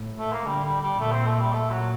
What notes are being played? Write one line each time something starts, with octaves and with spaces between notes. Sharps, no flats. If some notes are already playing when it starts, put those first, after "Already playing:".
Already playing: A2
A3
A#3
D3 G3
G3
G3
A#2 A3
C4
A3
G3
A#2 A3
F#3